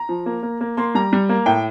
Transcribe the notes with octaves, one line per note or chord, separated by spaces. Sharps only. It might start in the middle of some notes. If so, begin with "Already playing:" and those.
Already playing: A#5
F3
A#3
A#3
A#3
A#3 C6
G3 A#5
G3
A#3
A2 G5